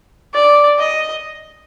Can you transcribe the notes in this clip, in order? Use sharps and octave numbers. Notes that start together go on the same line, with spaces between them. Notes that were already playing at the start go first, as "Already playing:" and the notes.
D5
D#5